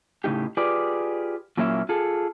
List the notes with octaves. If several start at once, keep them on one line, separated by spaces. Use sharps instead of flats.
A2 C#3 A#3 D#4 G4
F4 G4 G#4 B4 D5
A#2 F#3 A#3 C#4 E4 E5
F4 G#4 A4